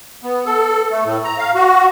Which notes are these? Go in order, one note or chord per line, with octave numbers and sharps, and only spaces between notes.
B3
A4
A3
A2
A#5
F5
F#4